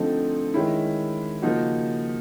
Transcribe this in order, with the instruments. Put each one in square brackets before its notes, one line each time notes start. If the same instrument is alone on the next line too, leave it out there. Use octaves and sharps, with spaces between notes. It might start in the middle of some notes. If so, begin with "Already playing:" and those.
Already playing: [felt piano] D3 F3 A3 C4 D#4
D#3 G#3 C#4 E4
C#3 F3 A#3 D#4 F#4